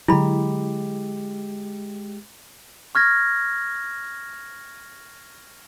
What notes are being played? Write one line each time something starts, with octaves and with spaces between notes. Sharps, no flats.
D3 F#3 G#3 E4 G4 B5
C#6 F6 G#6 A#6